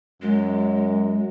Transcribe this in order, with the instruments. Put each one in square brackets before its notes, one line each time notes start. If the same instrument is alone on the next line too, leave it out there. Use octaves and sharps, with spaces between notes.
[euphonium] F#2 [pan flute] G#3